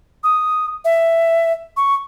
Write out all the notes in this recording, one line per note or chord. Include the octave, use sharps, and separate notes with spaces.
D#6
E5
C#6